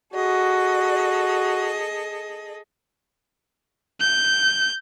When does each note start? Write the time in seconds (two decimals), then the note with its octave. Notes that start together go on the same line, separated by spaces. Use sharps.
0.14 F#4 G#4 A4 D#5
4.01 G6